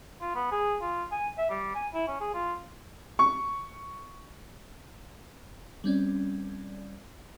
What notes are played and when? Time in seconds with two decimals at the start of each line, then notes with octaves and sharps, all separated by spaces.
0.21 F4
0.35 B3
0.52 G#4
0.82 F4
1.11 G#5
1.38 E5
1.50 G3
1.75 G#5
1.94 E4
2.08 C#4
2.21 G#4
2.34 F4
3.19 C#6
5.84 G3 C4 C#4 D5